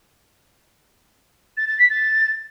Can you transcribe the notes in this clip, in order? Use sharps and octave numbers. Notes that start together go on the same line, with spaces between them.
A6
A6
B6
A6